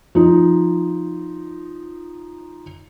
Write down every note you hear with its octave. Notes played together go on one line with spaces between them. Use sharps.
F3 D#4